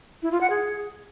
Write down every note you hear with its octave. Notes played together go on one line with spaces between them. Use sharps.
E4
F4
F#5
G#4